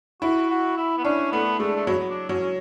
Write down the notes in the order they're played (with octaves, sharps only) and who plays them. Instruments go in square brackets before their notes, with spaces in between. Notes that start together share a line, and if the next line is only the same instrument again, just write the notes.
[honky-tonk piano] E4 [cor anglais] F#4
[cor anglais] F#4
E4
B3
[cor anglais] C#4 [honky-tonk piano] D4
[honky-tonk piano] A3 [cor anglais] B3
[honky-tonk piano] G#3 [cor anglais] A3
[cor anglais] A3
[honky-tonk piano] F#3 [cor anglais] B3
[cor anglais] D4
[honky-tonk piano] F#3 [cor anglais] C#4
[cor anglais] C#4